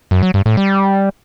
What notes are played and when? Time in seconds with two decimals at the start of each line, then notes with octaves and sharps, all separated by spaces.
0.11 F#2
0.23 F#3
0.34 G2
0.46 A2
0.57 G3